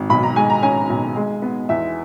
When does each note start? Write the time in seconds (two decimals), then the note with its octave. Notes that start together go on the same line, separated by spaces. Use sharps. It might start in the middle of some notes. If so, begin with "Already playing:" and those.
Already playing: G#1
0.10 B1 B5
0.23 A#5
0.36 G#3 G#5
0.50 A#5
0.63 C#4 G#5
0.90 B1
1.16 G#3
1.42 B3
1.69 E2 E5